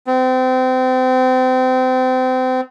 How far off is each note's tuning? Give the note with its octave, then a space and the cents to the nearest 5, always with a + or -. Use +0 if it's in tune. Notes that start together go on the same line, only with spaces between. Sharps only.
C4 -30